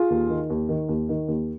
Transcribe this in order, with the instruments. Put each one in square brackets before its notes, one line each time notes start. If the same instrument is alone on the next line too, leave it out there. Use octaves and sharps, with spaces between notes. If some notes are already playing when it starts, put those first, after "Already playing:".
Already playing: [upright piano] F4 G#4
D#2
D#3
D#2
D#3
D#2
D#3
D#2